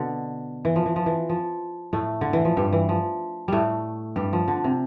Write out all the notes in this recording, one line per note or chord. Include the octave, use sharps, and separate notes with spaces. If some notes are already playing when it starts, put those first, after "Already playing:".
Already playing: B2 D3
E3
F3
E3
F3
E3
F3
A2 A3
D3
E3
F3
G2 G3
E3
F3
A2 G3 A3
G2 G3
F3
D3
C3